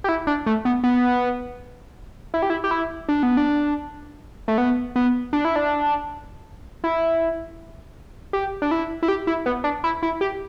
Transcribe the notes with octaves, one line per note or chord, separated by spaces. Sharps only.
G4
E4
D4
A3
B3
B3
E4
G4
E4
G4
E4
D4
B3
D4
A3
B3
B3
D4
E4
D4
E4
G4
D4
E4
E4
G4
E4
B3
D4
E4
E4
G4